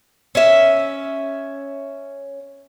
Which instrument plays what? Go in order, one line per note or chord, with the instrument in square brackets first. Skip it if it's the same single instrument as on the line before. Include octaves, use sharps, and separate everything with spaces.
[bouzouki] C#4 E5